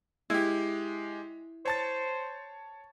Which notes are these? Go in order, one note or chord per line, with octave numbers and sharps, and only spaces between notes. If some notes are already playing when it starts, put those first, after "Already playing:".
G#3 E4 G4
C5 C#5 A5 A6